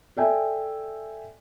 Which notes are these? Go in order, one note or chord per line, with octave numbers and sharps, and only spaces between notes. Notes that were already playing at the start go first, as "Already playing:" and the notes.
A4 D5 E5 G5 G#5